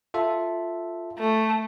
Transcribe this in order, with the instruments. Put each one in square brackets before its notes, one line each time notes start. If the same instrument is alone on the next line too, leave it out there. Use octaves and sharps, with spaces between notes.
[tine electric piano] F4 A4 E5
[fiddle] A3